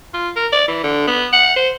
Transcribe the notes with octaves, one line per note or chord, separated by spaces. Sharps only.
F4
A#4
D5
E3
D3
B3
F#5
C5